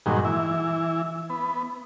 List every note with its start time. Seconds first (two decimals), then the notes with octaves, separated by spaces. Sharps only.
0.06 G2 A#2 D#3 F#3 G#3
0.25 E3 E4
1.30 B3